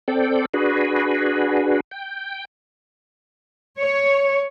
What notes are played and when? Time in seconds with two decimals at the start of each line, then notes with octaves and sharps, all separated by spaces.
0.08 C4 A4 D5 G5
0.54 D4 F#4 G#4 B4
1.91 G5
3.79 C#5